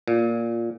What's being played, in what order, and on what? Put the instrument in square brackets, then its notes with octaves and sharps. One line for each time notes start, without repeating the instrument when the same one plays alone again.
[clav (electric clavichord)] A#2